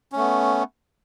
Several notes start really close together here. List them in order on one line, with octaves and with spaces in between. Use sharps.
C#4 A3 B3